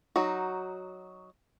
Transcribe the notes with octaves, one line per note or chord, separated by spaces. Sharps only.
F#3 D#4 F#4